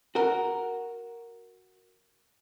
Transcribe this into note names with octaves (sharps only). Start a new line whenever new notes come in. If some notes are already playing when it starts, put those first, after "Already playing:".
F#4 A#4